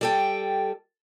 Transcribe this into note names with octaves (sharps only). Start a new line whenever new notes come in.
G3 A4 G5